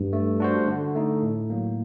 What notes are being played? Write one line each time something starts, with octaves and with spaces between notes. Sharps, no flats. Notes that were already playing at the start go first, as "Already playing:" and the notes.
Already playing: G2
A3
D4 F#4 C5
D3
A3 D#4
A2
F#3 A#3